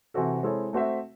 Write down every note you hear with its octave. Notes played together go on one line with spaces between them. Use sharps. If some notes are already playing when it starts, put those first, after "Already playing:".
C3 E3 C4 F#4 A4
G#3 C4 E4 A4 C#5
A3 C4 F#4 C5 E5